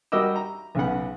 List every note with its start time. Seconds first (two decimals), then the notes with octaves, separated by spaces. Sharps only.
0.12 G3 F#4 A#4 D#5 D6 E6
0.36 A#5
0.75 B1 C#3 B3 F#5